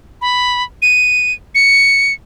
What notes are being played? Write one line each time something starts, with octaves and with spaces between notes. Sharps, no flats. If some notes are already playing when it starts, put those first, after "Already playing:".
B5
D#7
C#7